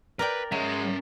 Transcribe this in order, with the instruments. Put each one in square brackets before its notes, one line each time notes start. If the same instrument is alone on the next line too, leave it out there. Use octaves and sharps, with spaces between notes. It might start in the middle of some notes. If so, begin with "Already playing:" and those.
[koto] A#4 D5 G5 [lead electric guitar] B4
[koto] F#3 [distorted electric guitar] G#3 [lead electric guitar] C#4 E5